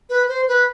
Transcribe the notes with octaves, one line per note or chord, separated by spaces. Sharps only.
B4
C5
B4